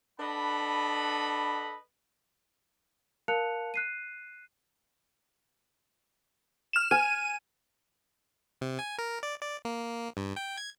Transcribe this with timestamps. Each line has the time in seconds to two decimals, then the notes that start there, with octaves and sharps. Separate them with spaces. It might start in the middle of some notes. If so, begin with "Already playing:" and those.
0.20 D4 A4 B4 D#5 F#5 B5
3.28 A#4 F5 A5 F#6 C#7 F7
3.74 F#6 C7 D#7
6.73 F6 E7
6.91 G#5 D#7
8.61 C3
8.79 G#5
8.98 A#4
9.23 D5
9.42 D5
9.65 A#3
10.17 G2
10.36 G5
10.57 G#6